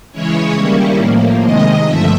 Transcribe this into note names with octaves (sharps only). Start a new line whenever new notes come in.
C#3 E3 G#3 C#4 E4 C#5
D#3 G3 A#3 C#4 E4
A2 F3 A#3
C3 D#3 G#3 D#5
G2 D3 F3 A3 E5